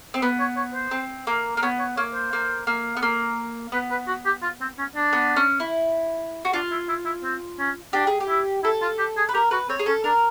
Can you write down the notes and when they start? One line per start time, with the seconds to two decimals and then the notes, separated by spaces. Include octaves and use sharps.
0.14 C4
0.22 B3 B4
0.39 C#5
0.57 C#5
0.74 C5
0.91 C4
1.27 A#3
1.57 A#3
1.62 B3 C#5
1.79 C#5
1.97 A#3 C#5
2.14 C5
2.33 A#3
2.67 A#3
2.97 B3
3.03 A#3
3.72 B3 B4
3.91 B4
4.07 F#4
4.25 G4
4.42 F4
4.61 C4
4.78 C#4
4.96 D4
5.13 B3
5.36 C#4
5.60 E4
6.45 F#4
6.53 D4 F4
6.71 E4
6.89 E4
7.05 E4
7.24 C4
7.59 C#4
7.93 D4 G4
8.07 G#4
8.20 G4
8.29 E4
8.63 E4 A4
8.82 F4
8.98 G4
9.17 G#4
9.29 B4
9.33 G4 A#4
9.51 F#4 B4
9.69 C4 C#5
9.79 G#4
9.86 C#4 A4
10.04 D4 A#4